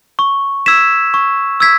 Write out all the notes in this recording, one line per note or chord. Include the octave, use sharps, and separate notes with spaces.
C#6
E6 G#6 B6 E7
C#6
E6 G#6 B6